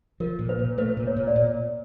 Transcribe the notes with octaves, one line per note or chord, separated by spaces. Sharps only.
F3 A#4
A#2
B4
A#2
A3 B4
A#2
C#5
A#2
D5
A#2